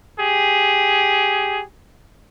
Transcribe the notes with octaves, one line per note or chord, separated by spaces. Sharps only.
G4 G#4